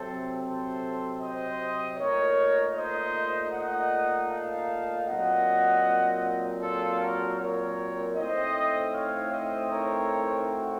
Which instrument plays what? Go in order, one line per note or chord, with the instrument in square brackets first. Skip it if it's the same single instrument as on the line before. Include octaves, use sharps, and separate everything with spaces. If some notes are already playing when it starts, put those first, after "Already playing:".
Already playing: [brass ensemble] C3 F#3 C4 A4 C5
A4 C5
C5 D#5
A#2 A3 D#4 A#4 C#5
C5 D#5
D#5 F#5
F5 A5
A#2 F#3 C4 D#5 F#5
F4 A4
F#4 A#4
A#4 C#5
A2 A3 C4 D#4 C5 D#5
C#5 F5
C5 D#5
A#4 C#5
F#4